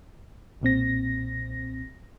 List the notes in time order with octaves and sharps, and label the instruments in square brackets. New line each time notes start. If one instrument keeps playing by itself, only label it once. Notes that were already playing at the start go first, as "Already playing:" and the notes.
[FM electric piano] B1 A#2 C4 A#6